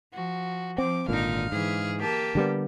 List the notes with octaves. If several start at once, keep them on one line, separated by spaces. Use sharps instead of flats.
F3 F#4
F3 C4 D6
G#1 A#2 D3 D#4 F5
G#2 E3 G#4
A#3 G4 A5
D3 G3 B3